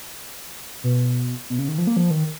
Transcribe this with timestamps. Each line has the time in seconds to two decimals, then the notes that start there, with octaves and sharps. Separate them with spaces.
0.84 B2
1.50 B2
1.59 C#3
1.68 D#3
1.78 F3
1.87 A#3
1.97 F3
2.11 D#3